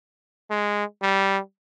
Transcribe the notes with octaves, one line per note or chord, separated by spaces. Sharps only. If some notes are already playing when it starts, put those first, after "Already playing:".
G#3
G3